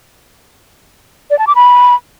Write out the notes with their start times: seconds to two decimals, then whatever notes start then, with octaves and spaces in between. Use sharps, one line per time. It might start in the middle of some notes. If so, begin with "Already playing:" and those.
1.30 D5
1.39 A5
1.47 D6
1.55 B5